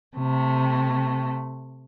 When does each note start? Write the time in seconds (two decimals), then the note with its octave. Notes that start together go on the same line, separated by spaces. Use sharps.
0.16 C3 A3